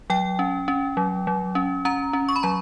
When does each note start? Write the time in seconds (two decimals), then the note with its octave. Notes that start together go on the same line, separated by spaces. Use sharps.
0.10 F#3 G5
0.39 C#4
0.68 C#4
0.97 F#3
1.27 F#3
1.55 C#4
1.85 C#4 A#5
2.13 C#4
2.29 C#6
2.36 B5
2.43 F#3 A#5